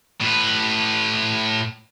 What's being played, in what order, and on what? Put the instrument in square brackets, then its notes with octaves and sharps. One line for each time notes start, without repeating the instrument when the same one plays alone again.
[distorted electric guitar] A2 B4